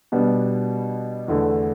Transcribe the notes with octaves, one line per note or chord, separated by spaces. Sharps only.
B2 G3 B3 D4
E2 D3 A3